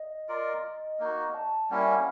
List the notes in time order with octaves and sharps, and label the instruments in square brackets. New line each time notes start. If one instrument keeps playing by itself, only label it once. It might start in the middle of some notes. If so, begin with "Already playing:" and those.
Already playing: [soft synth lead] D#5
[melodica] F4 A#4 D5
A#3 D#4 F#4
[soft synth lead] A5
[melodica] G3 A#3 C#4 E4 [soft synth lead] F#5
[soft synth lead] G5
F#5